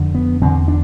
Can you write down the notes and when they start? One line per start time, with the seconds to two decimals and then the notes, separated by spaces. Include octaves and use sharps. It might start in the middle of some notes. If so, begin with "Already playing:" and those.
Already playing: F2 D3
0.15 B3
0.41 E2 D3 C4
0.68 D4